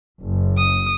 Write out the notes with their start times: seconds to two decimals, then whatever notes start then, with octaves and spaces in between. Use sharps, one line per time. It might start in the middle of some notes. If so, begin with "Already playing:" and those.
0.22 F#1
0.57 D#6